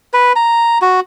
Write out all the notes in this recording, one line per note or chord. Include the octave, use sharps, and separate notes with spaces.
B4
A#5
F#4